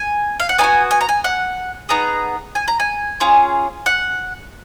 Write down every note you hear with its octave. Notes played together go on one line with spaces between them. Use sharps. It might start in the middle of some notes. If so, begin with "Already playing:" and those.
Already playing: G#5
F5
F#5
B3 D#4 G#5
F#4
G#5
A#5
G#5
F#5
B3 D#4 G#4 A#5
G#5
A#5
G#5
C#4 F4 G#4
F#5